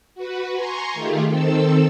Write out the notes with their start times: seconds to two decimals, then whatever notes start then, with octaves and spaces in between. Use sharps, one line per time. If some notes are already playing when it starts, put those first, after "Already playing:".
0.15 F#4 B4
0.54 G#5 A#5 C6 C#6
0.94 D#3 A3 F4 G4 G#4
1.28 D#3 C4 A4 E6